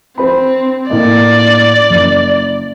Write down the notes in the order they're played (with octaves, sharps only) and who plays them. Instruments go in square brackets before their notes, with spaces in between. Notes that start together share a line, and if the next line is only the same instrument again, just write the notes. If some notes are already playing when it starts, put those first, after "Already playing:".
[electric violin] C4 [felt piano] C5 B5
[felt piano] A2 A#3 D#5 [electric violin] D5
[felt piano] F#1